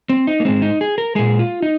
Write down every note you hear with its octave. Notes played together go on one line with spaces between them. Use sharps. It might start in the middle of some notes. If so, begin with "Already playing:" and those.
C4
D#4
A#3
G#2 G#3 C4
D#4
G#4
A#4
A#2 G#3 G#4
F4
D#4